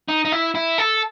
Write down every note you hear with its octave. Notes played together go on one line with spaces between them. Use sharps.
D#4
D#4
E4
E4
A4